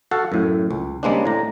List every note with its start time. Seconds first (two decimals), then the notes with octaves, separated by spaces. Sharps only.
0.11 F#4 A4 F5 F#5
0.32 F#2 A2
0.71 C#2
1.03 C#3 G3 G#3 A#3 C4 D4
1.25 A2 A#5